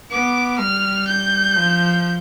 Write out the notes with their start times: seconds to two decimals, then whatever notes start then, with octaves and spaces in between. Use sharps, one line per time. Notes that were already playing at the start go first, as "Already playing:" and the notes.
0.11 B3 D6
0.59 G3 F6
1.08 G6
1.56 F3